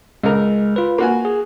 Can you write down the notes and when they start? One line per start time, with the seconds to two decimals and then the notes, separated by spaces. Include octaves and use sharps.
0.24 C#2 G#3 A#4
0.76 F4 B4
0.98 A#3 F#4 G#5
1.25 G#4